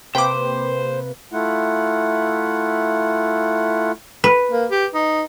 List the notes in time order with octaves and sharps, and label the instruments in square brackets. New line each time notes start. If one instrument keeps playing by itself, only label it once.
[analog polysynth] C3 A#3 B4 [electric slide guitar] C5 [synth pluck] G5 D6
[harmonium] A3 E4 F4 F#5
[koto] B4
[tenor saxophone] A#3
G4
D#4